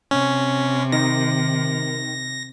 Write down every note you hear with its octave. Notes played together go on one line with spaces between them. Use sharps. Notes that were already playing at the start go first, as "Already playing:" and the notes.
C3 C#4
D#3 A#6